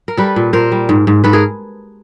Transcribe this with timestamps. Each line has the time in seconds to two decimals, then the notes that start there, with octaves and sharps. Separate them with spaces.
0.08 A#4
0.17 G3 A4 B4
0.36 A#2
0.53 A#2 A#4 C5
0.72 G3
0.89 G#2
1.07 G#2
1.24 G#2 A4 B4
1.33 G#4 A#4